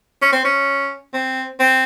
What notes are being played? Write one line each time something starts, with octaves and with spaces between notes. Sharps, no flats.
C#4
C4
C#4
C4
C4